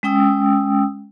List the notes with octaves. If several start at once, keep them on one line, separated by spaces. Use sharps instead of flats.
G#3 C#4 G5 D#6 E6